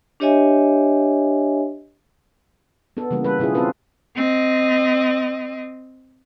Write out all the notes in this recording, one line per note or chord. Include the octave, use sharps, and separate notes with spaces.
D4 G4 C#5 D#5 E5 G#5
B3 D4 A4
C#3 E3 G3 A#3
G3 A4 B4
B2 C#4 E4 F4 G#4
B3 C4 D4 F4 A4 B4
C4 D#5